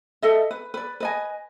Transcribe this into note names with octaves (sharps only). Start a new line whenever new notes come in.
A4 D#5 E5
B4
B4 D5
B4 D#5 G#5